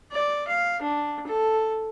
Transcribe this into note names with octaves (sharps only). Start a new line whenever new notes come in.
D5
F5
D4
A4